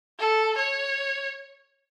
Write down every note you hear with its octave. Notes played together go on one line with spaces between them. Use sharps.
A4
C#5